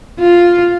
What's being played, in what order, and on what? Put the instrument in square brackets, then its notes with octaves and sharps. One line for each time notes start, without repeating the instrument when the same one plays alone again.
[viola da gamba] F4